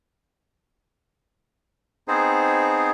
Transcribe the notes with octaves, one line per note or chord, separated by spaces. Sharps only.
B3 C4 D#4 G#4 C5